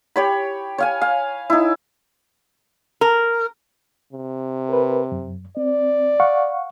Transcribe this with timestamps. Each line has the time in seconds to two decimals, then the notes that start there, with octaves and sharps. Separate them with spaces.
0.16 G4 C#5 B5
0.78 C#5 F5 G#5
1.01 F5
1.50 D#4 E4
3.01 A#4
4.13 C3
4.69 A#4 B4
5.12 F#2
5.57 C4 D5
6.20 F5 F#5 C#6